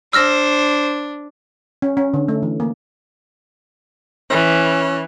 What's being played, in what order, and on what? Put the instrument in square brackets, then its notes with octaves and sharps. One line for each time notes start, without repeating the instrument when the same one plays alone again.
[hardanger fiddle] D4 [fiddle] C5 [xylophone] E6 F6 A#6
[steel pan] C#4
C#4
D3
A3
E3
A#3
[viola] E3 [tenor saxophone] C#4